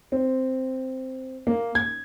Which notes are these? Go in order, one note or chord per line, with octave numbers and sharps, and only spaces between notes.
C4
A#3
G#6